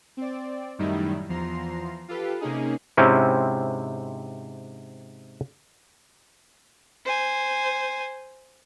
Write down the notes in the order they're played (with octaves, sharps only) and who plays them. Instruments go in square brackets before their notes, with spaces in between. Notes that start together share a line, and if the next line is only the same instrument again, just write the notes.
[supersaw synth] C4 D5
F#2 A2 D#3 G3 D#4 E4
E2 F3 A#5 C6
F4 G4 A4 B4
C3 A#3 C#4 D#4 G#4
[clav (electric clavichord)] G#2 C3 C4 C#4 E4
[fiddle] C5 G#5